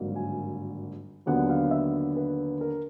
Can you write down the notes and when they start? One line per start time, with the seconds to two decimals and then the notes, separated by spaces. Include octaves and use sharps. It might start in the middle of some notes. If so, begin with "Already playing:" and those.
Already playing: G#1 G2 D3 F#3 A#3
0.16 G#5
1.26 D#2 D3 F#3 B3 D4 F#5
1.49 F5
1.71 E5
2.17 B4
2.61 A#4